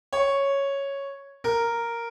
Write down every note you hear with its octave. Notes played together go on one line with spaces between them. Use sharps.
C#5
A#4